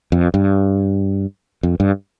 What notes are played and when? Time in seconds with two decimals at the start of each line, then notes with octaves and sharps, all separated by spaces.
0.12 F2
0.34 G2
1.63 F2
1.80 G2